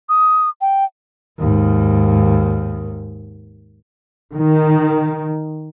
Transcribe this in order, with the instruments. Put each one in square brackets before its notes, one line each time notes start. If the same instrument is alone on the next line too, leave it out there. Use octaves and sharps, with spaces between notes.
[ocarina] D#6
G5
[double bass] D#2 G#2
[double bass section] D#3